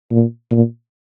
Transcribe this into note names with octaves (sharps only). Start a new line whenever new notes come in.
A#2
A#2